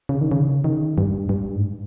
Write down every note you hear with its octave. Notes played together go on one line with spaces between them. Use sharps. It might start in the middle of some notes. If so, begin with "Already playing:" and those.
C#3
D#3
C#3
D#3
G2
G2
G#2